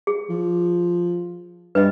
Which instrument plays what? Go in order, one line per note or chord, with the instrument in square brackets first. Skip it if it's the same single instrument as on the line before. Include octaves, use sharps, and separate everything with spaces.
[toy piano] G#4
[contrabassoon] F3
[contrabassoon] G2 [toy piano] B4 D#5